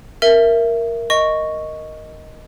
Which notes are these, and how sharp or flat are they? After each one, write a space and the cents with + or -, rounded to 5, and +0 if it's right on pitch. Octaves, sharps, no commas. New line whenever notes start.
A#4 +0 E5 +15
D#5 +0 C#6 +0